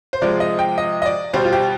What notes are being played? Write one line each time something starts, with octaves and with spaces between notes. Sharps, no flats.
C5
C3 F3 G#3 D5
D#5
G5
D#5
D#5
D5
B2 G3 C5
F4
G4